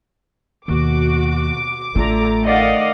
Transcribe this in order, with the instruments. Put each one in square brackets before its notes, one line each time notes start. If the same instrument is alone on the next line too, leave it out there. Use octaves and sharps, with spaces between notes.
[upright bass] D#2 [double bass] B2 [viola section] F#4 [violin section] D6
[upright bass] A1 F4 [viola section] D3 A#5 [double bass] A3
[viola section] D#3 D5 [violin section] D#5 F5 F#5